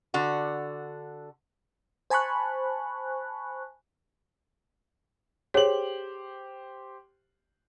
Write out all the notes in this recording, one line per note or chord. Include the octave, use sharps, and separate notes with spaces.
D3 F#4
C5 G#5 A5 B5 C#6 F#6
G4 G#4 C5 C#5 F#7